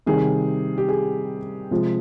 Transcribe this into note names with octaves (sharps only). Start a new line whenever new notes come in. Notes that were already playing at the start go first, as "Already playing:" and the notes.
C3 D#3 G3 G#4
G4
G#4
C3 F3 G#3